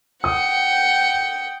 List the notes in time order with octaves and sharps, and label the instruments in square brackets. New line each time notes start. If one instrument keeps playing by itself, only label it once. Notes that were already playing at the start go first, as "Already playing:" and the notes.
[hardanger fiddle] F#5 G5 [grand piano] D#6